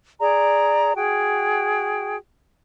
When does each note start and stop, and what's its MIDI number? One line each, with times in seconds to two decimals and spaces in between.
0.20 0.95 68
0.20 0.95 74
0.20 0.95 82
0.96 2.16 66
0.96 2.16 68
0.96 2.16 79